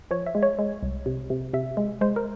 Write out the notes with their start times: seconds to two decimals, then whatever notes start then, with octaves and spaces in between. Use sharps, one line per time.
0.11 F3 C#5
0.26 E5
0.35 G#3
0.43 C#5
0.59 G#3
0.82 C2
1.06 C3
1.30 C3
1.54 C3 E5
1.77 G#3
2.01 G#3 C5
2.16 A#4